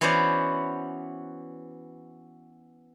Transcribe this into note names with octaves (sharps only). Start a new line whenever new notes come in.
E3 B3 C#4 F#4 C5 D5